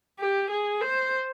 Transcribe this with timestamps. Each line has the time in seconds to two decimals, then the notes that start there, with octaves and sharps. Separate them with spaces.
0.19 G4
0.50 G#4
0.82 C5